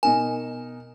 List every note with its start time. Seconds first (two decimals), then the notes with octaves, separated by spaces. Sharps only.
0.03 B2 D#4 A#4 G#5